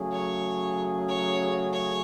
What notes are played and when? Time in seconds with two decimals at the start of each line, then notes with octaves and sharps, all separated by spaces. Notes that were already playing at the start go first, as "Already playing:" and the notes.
Already playing: C#3 F#3 A3 C#4 G#4
0.12 C#5
1.08 C#5
1.73 C#5